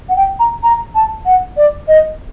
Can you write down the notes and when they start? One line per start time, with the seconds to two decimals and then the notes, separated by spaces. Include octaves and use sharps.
0.09 F#5
0.16 G5
0.40 A#5
0.63 A#5
0.95 A5
1.26 F#5
1.57 D5
1.88 D#5